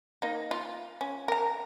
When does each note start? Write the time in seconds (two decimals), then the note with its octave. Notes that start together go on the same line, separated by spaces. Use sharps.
0.22 A#3 D#4
0.51 F4
1.01 C#4
1.28 A#4 A#5